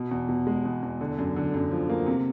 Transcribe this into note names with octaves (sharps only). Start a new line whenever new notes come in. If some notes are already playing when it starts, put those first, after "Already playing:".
Already playing: B2
E2
B2
G#3
E2
E2
D3
F#2
D3
F#2
F3
A#3
C3